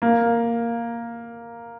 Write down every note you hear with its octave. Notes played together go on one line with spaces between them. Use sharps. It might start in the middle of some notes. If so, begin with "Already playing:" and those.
A#3